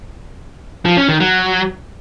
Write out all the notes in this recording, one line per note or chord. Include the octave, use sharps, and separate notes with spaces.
F3
C#4
D#3
F#3